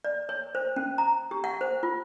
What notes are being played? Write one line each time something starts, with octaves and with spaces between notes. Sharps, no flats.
D5
C#5
C5
C#4
A#5
G4
F#5
C5
F4